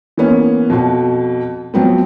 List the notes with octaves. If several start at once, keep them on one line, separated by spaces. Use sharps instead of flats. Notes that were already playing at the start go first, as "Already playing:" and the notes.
E3 A#3 B3 C#4
F2 B2
F3 F#3 B3 C4